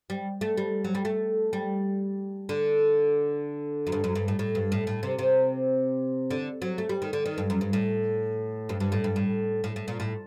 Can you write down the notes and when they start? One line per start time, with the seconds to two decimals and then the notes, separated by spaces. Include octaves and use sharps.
0.10 G3
0.41 A3
0.57 G3
0.84 F#3
0.95 G3
1.05 A3
1.53 G3
2.49 D3
3.87 F#2
3.92 G2
4.04 F#2
4.15 G2
4.28 A2
4.39 A2
4.55 G2
4.72 A2
4.87 A2
5.03 C3
5.19 C3
6.30 D3
6.62 F#3
6.78 A3
6.89 G3
7.02 D#3
7.13 D3
7.26 D#3
7.38 G2
7.50 F#2
7.61 G2
7.73 A2
8.69 G2
8.80 G2
8.92 A2
9.04 G2
9.16 A2
9.64 A2
9.76 A2
9.88 A#2
10.00 A2